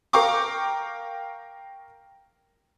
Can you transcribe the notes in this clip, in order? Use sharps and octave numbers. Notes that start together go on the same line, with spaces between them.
A#4 F5 G5 C#6 D6